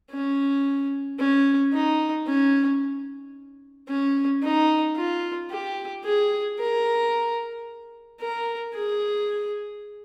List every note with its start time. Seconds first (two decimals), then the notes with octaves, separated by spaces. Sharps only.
0.11 C#4
1.19 C#4
1.73 D#4
2.27 C#4
3.89 C#4
4.43 D#4
4.97 F4
5.51 G4
6.05 G#4
6.59 A#4
8.20 A#4
8.74 G#4